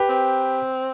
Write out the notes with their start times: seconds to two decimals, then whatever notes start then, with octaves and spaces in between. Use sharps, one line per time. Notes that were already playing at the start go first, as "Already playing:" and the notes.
Already playing: G4 B4
0.09 C4